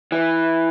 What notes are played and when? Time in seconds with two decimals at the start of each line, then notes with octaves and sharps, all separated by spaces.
0.12 E3